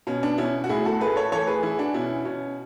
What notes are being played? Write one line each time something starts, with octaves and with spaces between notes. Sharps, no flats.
B2 C#4
B3 D4
B2 C#4 E4
F#4
A2 E4 G#4
F#4 A4
A3 G#4 B4
A4 C#5
E3 A4 C#5
G#4 B4
E3 E4 G#4
D4 F#4
B2 C#4 E4
B2 C#4